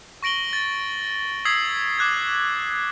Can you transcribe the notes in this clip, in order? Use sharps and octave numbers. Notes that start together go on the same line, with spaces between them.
C#6 A#6 D7 F#7 G7
A6
D#6 E6 G#6 B6 C7 F#7
D6 F#6 G#6